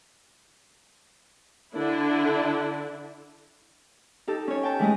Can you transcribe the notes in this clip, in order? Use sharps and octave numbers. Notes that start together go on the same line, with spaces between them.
D3 D4 E4
D#4 G4 A4
C#4 C#5
G5 A5
E3 G#3 A3 D#5